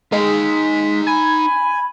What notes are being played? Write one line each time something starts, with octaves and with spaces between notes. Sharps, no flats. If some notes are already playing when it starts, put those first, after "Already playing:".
G#3 D#4 F5 B6
G#5 B5